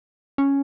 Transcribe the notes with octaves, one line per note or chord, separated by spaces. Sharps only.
C#4